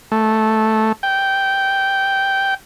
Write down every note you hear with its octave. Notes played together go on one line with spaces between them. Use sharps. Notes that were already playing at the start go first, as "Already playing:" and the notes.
A3
G5